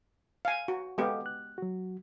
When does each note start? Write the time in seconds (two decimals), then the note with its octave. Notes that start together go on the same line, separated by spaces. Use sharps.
0.45 F5 G#5
0.68 F#4
0.98 G#3 B3 G4 A4 D#5 F5
1.26 F#6
1.58 F#3 F#4